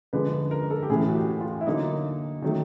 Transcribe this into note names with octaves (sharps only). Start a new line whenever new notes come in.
D3 F3 G#3 B4
B4
A#4
A4
G4
A2 E3 A3 G#4
F#4
G4
F4
E4
D3 F#3 A#3 D#4
D#3 F#3 A3